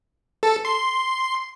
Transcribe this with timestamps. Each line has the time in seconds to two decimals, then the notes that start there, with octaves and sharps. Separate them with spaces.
0.43 A4
0.65 C6